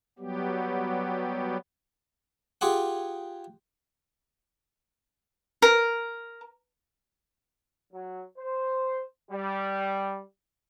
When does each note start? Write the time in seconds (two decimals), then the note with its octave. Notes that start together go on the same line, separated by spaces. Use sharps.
0.19 F#3 G3 B3 G4
2.61 F4 G4 G#4 F#5
5.62 A#4
7.93 F#3
8.38 C5
9.32 G3